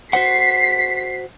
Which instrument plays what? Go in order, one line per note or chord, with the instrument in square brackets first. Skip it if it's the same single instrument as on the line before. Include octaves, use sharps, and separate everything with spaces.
[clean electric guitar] F#4 C5 F#5 [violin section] B6 C7